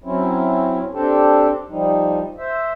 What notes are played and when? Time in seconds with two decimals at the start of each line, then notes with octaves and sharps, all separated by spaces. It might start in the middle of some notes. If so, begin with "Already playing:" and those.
0.04 F#3 C4 C#4 E4
0.93 C4 D4 G4 A4
1.69 F3 G3 D#4
2.38 C5 E5